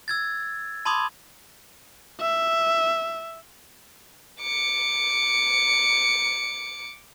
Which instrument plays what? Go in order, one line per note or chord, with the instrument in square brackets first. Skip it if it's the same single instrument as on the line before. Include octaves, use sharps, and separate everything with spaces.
[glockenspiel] E6 G#6 A6
A5 B5 C6 D6 D#6 G#6
[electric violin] E5
[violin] D6 C#7